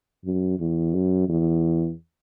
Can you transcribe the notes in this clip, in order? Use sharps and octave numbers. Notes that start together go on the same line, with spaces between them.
F#2
E2
F#2
E2